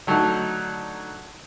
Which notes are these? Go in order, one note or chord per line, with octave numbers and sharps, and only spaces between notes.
D3 F#3 A3 D#4